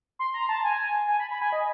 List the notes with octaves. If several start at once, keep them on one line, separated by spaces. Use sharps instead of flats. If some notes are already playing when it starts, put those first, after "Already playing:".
C6
A#5
A5
G#5
G#5
B5
B5
G#5
D#5